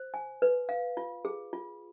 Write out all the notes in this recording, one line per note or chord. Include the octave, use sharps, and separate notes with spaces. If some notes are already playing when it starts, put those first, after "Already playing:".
Already playing: C5
G#5
B4
F5
F4
G#4
F4